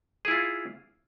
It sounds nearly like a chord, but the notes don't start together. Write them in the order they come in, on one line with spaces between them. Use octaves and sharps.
G#4 E4 F4